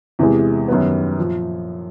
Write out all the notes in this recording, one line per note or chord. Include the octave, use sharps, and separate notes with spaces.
E2 C3 E3 G#3
F#2 D#3 G3 B3
A#2 F3